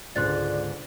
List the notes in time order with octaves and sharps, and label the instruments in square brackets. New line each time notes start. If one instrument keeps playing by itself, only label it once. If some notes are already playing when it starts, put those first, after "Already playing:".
[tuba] C#2 [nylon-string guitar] G#2 D3 [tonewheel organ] D5 [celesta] C6 F#6 A6